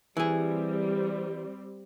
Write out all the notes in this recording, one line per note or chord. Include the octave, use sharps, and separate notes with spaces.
E3 G3 C4 G#4